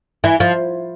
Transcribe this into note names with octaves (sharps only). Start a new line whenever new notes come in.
E3
F3